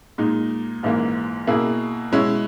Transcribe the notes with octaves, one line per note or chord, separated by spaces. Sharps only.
A#2 G#3 D#4
A#1 G#2 E3 A#3
B2 A#3 E4 G#4
B2 G#3 C#4 E4